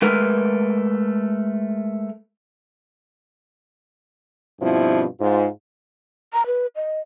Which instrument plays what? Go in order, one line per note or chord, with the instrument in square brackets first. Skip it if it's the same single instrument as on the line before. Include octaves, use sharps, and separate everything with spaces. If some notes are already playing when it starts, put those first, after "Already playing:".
[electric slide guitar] G#3 A3 A#4 B4
[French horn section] G2 B2 F3 C4 E4 F4
G#2 F4
[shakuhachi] A#5
B4
D#5